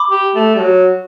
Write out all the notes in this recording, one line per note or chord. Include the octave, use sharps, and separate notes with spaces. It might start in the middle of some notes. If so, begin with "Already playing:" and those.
Already playing: B5 D6
G4
A3
G3
F#3